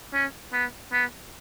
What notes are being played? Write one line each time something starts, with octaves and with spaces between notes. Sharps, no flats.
C#4
B3
B3